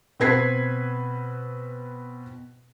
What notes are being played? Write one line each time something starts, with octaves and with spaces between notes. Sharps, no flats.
B2 C4 B4 G#6 B6 C7